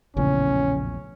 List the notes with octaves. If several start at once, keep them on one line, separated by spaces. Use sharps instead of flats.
A#1 E2 A2 C#3 C#4